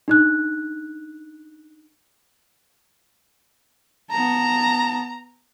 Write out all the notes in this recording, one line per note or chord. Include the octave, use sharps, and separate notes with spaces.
D4 D#4 F#6
B3 A5 A#5